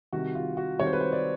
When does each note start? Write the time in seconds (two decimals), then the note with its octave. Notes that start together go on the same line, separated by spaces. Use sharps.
0.13 C2 C3 D#3 F#4
0.35 F4
0.57 F#4
0.79 C2 C3 D#3 C#5
0.87 C5
0.93 B4
1.00 C5
1.12 D5